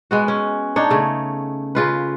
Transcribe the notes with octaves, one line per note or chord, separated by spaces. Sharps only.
G#3 B3 F#4
C#4
D4 D#4 C#5
C#3 A3
C#3 F4 B4